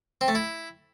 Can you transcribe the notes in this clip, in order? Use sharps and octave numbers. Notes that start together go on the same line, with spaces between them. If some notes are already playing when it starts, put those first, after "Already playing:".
C4
A3
E4